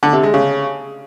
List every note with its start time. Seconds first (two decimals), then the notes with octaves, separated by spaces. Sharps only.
0.03 D3
0.13 C3
0.23 G#3
0.34 C#3